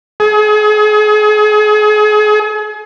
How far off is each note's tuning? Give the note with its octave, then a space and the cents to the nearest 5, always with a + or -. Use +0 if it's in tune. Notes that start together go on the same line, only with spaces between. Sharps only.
G#4 +35